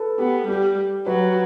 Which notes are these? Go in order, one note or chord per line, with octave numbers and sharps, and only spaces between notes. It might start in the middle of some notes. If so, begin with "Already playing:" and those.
Already playing: A4 B4
B3 G4
G3 G4
F#3 B4